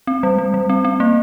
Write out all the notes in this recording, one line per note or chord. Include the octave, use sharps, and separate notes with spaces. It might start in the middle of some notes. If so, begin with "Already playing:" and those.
C4
G3
G3
G3
C4
C4
A#3